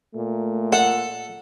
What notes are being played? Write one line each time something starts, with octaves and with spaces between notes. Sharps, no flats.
A#2 A3
A4 F#5